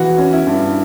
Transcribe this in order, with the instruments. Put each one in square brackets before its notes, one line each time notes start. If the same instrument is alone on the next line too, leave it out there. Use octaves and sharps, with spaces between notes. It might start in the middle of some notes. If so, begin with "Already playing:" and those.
Already playing: [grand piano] E3 [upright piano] F#4
[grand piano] C#4
[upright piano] E4
[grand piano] G2